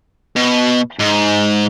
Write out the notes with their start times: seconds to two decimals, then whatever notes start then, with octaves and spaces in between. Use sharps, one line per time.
0.36 B2
1.00 G#2